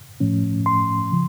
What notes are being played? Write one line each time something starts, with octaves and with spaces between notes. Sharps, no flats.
A2 F3 A3 C#4
C6
C#3 F3